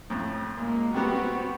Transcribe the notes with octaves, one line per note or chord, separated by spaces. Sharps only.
F2 A2
A#2 G#3 A#3
G3 B3 C4 F#4 G4